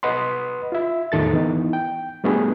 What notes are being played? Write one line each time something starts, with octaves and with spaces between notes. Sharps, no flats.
B4 D#5 F#5 B5 C6
F4 E5
E2 A2 D#3 A4 A6
E3 B3 D#4
G5
G3 A3 B3 D4 F#4 G#4